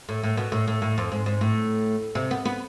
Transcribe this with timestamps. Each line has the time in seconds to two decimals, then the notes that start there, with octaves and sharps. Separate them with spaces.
0.09 A2
0.23 A2
0.37 B2
0.52 A2
0.68 A2
0.82 A2
0.98 F2
1.12 G#2
1.26 G#2
1.41 A2
2.15 C3
2.31 B3
2.45 B3